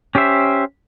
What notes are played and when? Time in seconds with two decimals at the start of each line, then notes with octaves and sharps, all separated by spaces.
0.15 C#4 G4 C5 E5